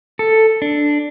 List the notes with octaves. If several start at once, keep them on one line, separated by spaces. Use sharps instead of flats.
A4
D4